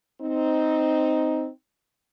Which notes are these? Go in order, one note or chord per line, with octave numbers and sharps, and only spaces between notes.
C4 D#4